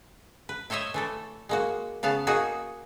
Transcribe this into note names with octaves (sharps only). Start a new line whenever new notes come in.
B4
E4 C5 C#5 D#5 E5
E3 A3 A4
G#3 A#3 F#4
C#3 B3 F5 F#5 A5
A#3 D#4 F#4 G#4